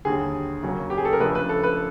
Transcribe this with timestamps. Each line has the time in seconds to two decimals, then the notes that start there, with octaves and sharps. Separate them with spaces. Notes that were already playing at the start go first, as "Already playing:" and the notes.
0.05 D#2 D3 G3 G#4
0.63 C#3 F#3 A#3 C#4
0.90 G4
0.98 G#4
1.05 A4
1.13 A#4
1.20 C#3 F3 A3 D4 B4
1.35 B4
1.49 A4
1.63 B4